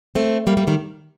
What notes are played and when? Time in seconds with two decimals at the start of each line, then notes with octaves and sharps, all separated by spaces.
0.15 A3 C4
0.47 G3 A#3
0.57 G3 A#3
0.67 D#3 G3